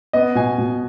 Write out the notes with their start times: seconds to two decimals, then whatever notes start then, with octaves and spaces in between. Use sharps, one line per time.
0.13 B3 D#5
0.35 B2 G#5
0.58 B2